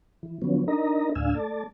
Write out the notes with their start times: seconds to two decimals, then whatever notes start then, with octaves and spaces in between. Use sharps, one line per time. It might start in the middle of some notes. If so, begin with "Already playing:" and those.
0.23 E3
0.42 D3 F3 F#3 B3 C#4
0.68 D4 D#4 A#4 D#5 A#5
1.15 D2 A2 D4 F5 G#5 E6
1.35 A3 D5 A5